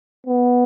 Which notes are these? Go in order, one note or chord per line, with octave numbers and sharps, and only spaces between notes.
B3